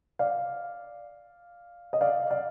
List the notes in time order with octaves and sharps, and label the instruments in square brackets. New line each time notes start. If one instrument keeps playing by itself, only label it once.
[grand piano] D5 F5
D#5
D5 F5
D5 F5